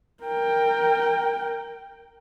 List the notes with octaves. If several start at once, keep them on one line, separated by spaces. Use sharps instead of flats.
A#4 G5